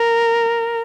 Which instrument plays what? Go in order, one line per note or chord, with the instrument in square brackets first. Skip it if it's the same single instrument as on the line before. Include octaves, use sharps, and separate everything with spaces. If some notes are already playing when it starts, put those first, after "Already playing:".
Already playing: [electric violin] A#4